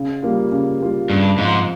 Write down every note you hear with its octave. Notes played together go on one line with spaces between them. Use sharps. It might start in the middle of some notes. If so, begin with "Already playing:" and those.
Already playing: C#3
G3 A#3 F4
C#3
G3 A#3 F4
G2 C#3
G#2 F3 C4